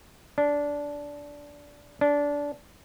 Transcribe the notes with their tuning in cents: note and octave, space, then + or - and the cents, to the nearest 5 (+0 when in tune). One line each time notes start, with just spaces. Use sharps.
D4 -15
D4 -20